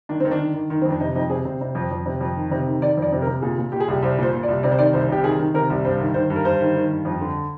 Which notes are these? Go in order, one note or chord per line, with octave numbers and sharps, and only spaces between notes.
D#3 D4
D#3 C4
D4
D#3
D#3
D#3
F2 C4
D4
C3 D#4
F2 D#4
C3 G#4
C3 C5
C3
F2
F2
C3
F2
D#3
C3
D#3
D#3 D5
F2
D5
C3
A#4
C3
A#2 G#4
A#2
A#2 G4
G#4
C2 G4
C2 C5
A#2 C5
A#2
D5
C2
C3 D5
C5
D#3 D5
C2 C5
C3 G4
D#3 G#4
D#3
C3 A#4
C2
G2 C5
D#3
D#3 C5
G2
A#4
G2 C5
D#3
D#3
G2
F2
D3